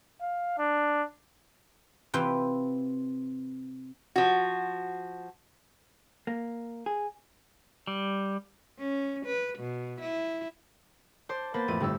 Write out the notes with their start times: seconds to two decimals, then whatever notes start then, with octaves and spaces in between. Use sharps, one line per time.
0.22 F5
0.59 D4
2.14 C3 E3 F4 B4 G5
4.16 F3 F#4
6.27 A#3
6.86 G#4
7.87 G3
8.79 C#4
9.26 B4
9.59 B2
10.01 E4
11.29 C5 A5 D6
11.54 A#3 B3 B4 C5 A6
11.68 A1 F2 A3 C4 D#7
11.80 G1 G3 A4 E6